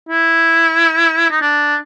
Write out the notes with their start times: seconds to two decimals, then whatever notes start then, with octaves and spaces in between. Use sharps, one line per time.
0.09 E4
1.30 D#4
1.41 D4